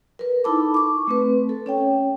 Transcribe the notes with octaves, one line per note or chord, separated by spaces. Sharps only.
A#4 B4
D#4 E4 A4 A5 B5 D6
C#6 D6
A3 C4 B4
A4
C#4 C#5 G5